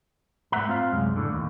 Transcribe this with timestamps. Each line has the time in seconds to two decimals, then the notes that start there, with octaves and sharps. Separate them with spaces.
0.52 G#2 A3 B3 E5 F#5 A#5
0.68 C4 F4 C5 F5
0.92 C2 F#2 G#3
1.16 A2 D3
1.33 D#2